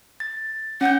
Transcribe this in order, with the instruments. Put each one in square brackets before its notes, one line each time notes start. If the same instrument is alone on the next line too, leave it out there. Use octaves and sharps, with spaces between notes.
[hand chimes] A6
[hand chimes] C#4 G6 [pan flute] F#5